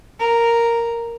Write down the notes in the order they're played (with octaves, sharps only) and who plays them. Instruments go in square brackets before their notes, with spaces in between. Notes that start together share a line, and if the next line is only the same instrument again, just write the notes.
[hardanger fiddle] A#4